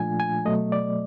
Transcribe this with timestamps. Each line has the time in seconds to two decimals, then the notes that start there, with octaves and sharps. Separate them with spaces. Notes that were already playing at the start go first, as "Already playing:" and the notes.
Already playing: A#2 F3 A3 D4 F4 G#5
0.20 G#5
0.45 B2 F#3 A3 D#5
0.72 D5